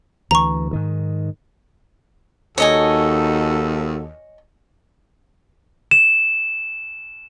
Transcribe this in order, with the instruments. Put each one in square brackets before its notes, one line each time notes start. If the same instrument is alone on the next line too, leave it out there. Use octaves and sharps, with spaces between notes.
[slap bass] D2 E3 [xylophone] A#5 C#6
[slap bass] G#2 D#3
[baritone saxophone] D#2 [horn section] D#4 F#4 A4 [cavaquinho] C#5 D#5 G#5
[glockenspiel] E7